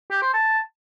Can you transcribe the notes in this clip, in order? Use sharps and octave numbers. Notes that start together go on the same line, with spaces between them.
G4
C5
A5